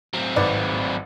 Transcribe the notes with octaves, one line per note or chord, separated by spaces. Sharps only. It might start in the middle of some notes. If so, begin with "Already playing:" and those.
F#3 C4
G#1 B4 D5